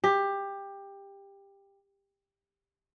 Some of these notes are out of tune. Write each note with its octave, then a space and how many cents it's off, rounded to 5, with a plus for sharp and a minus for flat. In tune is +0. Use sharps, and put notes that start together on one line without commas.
G4 +15